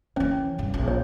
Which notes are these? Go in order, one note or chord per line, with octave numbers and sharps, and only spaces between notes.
D#3 E3 C#4 C#5
B1 G2
A#1
C#5